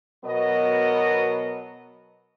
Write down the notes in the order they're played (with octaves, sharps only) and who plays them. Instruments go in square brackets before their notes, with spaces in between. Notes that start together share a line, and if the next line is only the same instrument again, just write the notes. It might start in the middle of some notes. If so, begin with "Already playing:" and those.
[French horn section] B2 F#3 B3 A#4 D#5